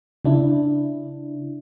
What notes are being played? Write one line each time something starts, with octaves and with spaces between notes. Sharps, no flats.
C#3 D4 E4